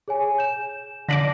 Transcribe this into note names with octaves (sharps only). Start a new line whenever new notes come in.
G#4 C#5 G#5
G6 E7
D3 D4 D6 A#6 B6 F#7